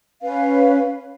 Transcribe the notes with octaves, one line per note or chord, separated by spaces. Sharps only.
C#4 B4 F5